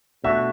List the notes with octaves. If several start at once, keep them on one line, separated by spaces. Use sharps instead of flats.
B2 A3 D4 F#4 E5